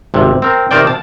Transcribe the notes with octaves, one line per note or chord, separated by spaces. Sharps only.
G#1 C3
C4 A#4
C3 D#3 A#4 C5 D5 G5
A5